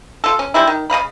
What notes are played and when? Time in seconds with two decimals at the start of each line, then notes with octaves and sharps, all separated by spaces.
0.24 F4 A4
0.39 C#4
0.54 G3 G#3 D4 E4
0.67 D#3
0.90 C#3 D#5 F5 B5